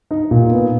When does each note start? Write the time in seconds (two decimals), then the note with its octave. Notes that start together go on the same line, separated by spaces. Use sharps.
0.11 D#4
0.31 A#2
0.51 B3